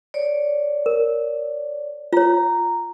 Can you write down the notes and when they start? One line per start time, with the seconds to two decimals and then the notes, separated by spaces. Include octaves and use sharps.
0.14 C#5 D5
0.86 A#4
2.13 F4 C#5 A#5